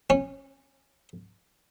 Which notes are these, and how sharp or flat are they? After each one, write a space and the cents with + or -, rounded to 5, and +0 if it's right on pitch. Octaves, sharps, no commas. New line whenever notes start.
C#4 -20